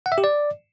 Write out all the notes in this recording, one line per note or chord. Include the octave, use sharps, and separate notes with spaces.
F#5
E5
G4
D5